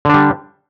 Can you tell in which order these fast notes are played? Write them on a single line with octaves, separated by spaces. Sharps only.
D3 D4 G3